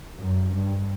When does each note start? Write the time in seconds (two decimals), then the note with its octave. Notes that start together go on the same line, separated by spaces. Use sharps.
0.19 F#2
0.55 G2